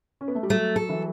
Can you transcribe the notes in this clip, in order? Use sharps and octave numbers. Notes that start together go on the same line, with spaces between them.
C#4
B3
A3
G3
F#3 A3
A4
E3